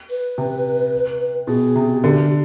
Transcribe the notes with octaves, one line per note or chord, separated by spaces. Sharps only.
B4
C3
B2 G#4
C3
D3 G4